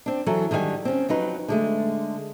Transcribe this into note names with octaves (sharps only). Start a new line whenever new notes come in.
C4 D4
E3 F#3 F#4 A4
D3 D#3 G3 F5 G#5
C4 C#4
F2 F#3 D#4 B4
D3 G#3 A3